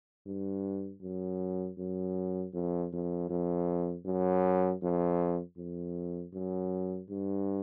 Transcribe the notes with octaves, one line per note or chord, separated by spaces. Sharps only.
G2
F#2
F#2
F2
F2
F2
F#2
F2
F2
F#2
G2